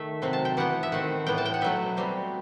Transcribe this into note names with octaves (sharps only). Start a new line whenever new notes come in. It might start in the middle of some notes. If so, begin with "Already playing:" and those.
Already playing: D#3 A3 E5
C3 F#3 C4
A5
G5
E3 B3 F#5
E5
D#3 A3 C4 F#5
A2 E3 B3 G5
A5
G5
F#5
B2 F#3 A3 E5
B2 G3 C4